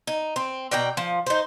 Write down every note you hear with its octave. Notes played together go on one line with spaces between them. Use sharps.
D#4
C4
B2 D5 G5 A#5
F3
D#4 C5